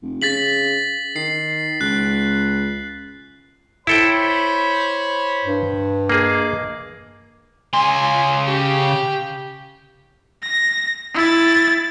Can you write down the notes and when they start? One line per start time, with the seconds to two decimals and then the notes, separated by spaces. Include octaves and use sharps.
0.02 F1
0.22 C#3 A6 B6 F#7
1.16 D#3 C7
1.81 C#2 F#6
3.87 E4 A4 C5 C#5 G5 B5
5.45 G2
6.09 A#3 G#4 D#5 D6
7.73 C#3 G#5 C6
8.48 G4
10.43 A#6
11.14 E4 A6